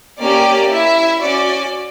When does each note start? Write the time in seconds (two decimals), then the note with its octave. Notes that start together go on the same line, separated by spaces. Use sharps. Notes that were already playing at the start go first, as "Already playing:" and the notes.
0.19 A#3 C#4 G4 D5
0.70 E4 E5
1.20 C#4 F#4 D5